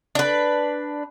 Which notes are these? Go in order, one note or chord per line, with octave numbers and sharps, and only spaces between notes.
D4 B4